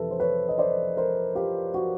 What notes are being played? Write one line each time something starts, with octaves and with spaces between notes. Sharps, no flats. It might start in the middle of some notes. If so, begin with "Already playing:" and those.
Already playing: F2 C3 E3 A4 B4 E5
C5
B4 C#5
D#5
C5 D5
A#4 C5
F4 G4
F#4